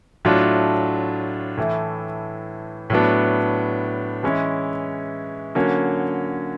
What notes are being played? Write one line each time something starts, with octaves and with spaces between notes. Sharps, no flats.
A2 F#3 A3 D4 F4
A2 E3 A3
A2 F#3 B3 D4
E3 G#3 C#4 E4
D3 F#3 A#3 C#4